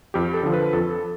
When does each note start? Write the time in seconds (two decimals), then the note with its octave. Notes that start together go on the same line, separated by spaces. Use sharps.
0.14 F2 G4
0.34 A4
0.43 D3 F3
0.54 B4
0.73 F2 A4